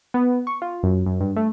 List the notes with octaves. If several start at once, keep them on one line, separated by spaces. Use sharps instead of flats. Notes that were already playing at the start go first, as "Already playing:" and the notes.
B3
C#6
F4
F#2
F#2
G2
A3